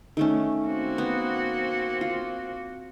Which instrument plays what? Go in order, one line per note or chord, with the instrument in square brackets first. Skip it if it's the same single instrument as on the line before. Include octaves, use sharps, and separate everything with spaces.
[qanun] D#3 A3 C#4
[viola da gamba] A#3 C4 F#4
[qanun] B3
F4